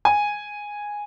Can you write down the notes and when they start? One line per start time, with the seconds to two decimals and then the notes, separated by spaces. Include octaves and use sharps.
0.05 G#5